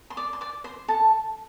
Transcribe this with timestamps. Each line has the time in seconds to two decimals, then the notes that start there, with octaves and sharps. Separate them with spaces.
0.10 C6
0.17 D5 D6
0.33 C6
0.41 D5 D6
0.64 C5 C6
0.88 A4 A5